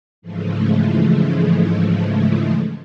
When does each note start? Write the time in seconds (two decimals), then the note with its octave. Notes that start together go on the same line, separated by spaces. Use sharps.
0.22 G#2 C#3 E3 F3 G#3 A3